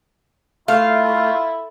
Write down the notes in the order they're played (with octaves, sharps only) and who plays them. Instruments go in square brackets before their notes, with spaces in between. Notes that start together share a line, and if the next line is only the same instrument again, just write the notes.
[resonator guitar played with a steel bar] A3 [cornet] E4 [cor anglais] F4 [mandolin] F5